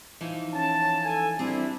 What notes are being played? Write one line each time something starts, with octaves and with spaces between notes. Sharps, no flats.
E3 F3 D#4
C#4 A5
A4 G#5
G3 C4 D4 E4 G#4